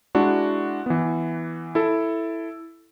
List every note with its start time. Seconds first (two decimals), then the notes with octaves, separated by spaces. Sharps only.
0.15 G#3 D4 E4 F#4
0.86 E3 B3
1.75 E4 A4